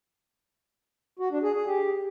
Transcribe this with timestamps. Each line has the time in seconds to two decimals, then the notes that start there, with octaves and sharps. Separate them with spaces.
1.19 F#4
1.31 D4
1.43 G#4
1.55 G#4
1.67 G4